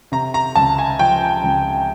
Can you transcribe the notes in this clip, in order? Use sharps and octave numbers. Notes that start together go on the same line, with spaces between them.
C3 A#5
A#5
C#2 A5
G#5
F3 G5
C#2